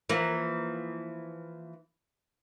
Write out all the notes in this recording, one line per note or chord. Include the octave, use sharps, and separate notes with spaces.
E3 F3 A#3